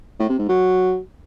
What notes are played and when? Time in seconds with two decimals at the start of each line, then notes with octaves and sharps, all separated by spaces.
0.20 A2
0.29 C3
0.39 G#2
0.49 F#3